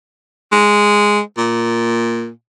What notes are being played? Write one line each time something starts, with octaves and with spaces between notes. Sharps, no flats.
G#3
A#2